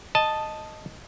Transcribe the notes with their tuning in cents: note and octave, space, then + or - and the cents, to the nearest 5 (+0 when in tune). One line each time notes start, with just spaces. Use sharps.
D#5 -5 A5 +0